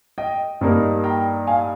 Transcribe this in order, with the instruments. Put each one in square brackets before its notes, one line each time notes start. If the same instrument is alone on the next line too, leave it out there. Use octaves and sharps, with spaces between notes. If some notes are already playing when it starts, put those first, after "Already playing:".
[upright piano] D#5 G5
[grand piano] G2 G3 A#3 D#4 A#4
[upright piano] G5 A#5
F5 G#5